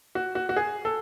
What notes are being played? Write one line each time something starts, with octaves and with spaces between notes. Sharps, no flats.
F#4
F#4
F#4
G#4
A4